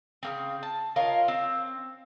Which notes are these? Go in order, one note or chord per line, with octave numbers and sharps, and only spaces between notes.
C#3 A#3 C4
A5
F4 A#4 C#5 D#5
C4